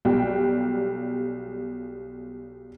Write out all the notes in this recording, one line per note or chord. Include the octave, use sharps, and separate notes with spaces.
B1 G3 G5